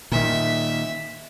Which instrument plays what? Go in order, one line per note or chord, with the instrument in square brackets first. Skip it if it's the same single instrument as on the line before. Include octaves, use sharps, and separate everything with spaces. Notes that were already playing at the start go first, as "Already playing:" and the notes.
[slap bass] A#2 D#3 [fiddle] E5